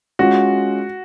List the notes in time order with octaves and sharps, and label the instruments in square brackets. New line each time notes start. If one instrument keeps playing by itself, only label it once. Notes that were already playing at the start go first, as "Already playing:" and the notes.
[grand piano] G#3 C#4 F4 [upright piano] F#4